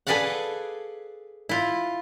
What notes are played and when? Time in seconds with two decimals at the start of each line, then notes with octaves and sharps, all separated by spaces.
0.07 G#4 A4 B4 D5 F5 F#5
1.49 E4 F4